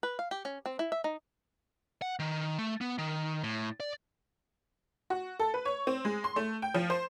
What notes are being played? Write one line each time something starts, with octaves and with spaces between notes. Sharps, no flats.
B4
F5
G4
C#4
C4
E4
E5
D#4
F#5
D#3
A3
B3
D#3
A2
D5
F#4
A4
B4
C#5
C4
G#3
C6
A3
G5
F3
C5